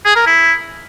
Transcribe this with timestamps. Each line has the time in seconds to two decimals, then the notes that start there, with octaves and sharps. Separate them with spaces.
0.05 G#4
0.16 A#4
0.26 E4